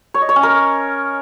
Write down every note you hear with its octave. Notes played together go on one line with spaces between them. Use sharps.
C#5
D#5
C#5
C#4
A#4